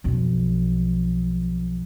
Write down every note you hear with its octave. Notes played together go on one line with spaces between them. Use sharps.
B1 F2